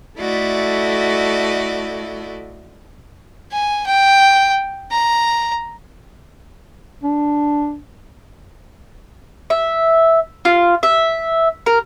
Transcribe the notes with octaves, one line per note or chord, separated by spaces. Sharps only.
A3 E4 F#4 A4 D5 D#5
G#5
G5
A#5
D4
E5
F4
E5
A#4